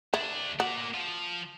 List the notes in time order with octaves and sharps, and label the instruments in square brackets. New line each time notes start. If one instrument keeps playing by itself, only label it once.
[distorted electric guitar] D2 D4 [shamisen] E4
[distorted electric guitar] A#3 D5 [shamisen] F#4
[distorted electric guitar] F3